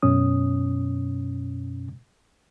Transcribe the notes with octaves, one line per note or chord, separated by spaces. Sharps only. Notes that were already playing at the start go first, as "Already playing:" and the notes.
F#2 B2 C#4 D#6